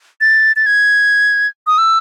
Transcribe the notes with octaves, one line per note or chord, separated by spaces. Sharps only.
A6
A6
G#6
D#6
E6